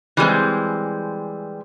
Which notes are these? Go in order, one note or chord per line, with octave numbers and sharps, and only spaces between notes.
E3 G3 G#3 C4